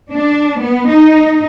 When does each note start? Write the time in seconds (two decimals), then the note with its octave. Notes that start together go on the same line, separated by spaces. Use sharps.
0.11 D4
0.59 B3
0.89 D#4